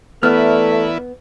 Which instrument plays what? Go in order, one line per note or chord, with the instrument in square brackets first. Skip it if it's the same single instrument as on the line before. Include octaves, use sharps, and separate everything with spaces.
[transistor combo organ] E3 E4 B4 [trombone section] A3 [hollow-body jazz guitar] B3 [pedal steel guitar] A#4 D5 F6